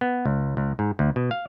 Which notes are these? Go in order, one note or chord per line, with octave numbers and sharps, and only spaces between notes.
B3
C#2
C#2
G#2
D2
B2
F5